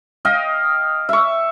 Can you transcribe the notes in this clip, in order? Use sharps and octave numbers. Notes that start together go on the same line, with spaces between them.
D#5 F5 G5
E5 C#6